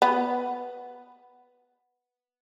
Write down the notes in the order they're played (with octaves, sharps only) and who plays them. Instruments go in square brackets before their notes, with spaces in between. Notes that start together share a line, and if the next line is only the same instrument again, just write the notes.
[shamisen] B3